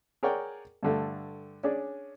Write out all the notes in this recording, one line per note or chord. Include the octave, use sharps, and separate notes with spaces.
G#4 A#4 C#5 D5 F#5 G5
G2 D3 A3
C#4 D4 G#4 D5